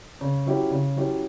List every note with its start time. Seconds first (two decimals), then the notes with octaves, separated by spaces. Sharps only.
0.21 C#3
0.46 F#3 C#4 E4 G4
0.71 C#3
0.96 F#3 C#4 E4 G4